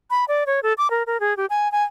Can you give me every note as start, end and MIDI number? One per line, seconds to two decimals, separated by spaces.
0.10 0.25 83
0.28 0.44 74
0.47 0.60 73
0.63 0.73 69
0.78 0.90 86
0.90 1.03 70
1.07 1.20 70
1.20 1.36 68
1.37 1.46 67
1.50 1.71 80
1.72 1.84 80